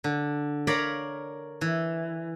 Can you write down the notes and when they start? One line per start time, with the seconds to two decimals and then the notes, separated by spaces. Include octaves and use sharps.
0.04 D3
0.67 A#4 C#5 D5 F5 A#5 B5
1.61 E3